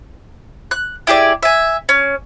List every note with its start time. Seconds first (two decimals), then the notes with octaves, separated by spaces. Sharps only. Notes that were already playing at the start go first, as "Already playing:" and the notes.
0.71 F#6
1.07 E4 G4 G#4 D5
1.43 E5 G#5
1.89 C#4